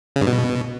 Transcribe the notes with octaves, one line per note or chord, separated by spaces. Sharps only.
C#3
G2
B2